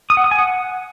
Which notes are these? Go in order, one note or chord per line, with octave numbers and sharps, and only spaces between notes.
D#6
F#5
D#6
G#5
F#5